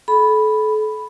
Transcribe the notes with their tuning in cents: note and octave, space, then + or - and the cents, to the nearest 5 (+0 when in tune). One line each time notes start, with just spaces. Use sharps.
A4 -35 B5 +0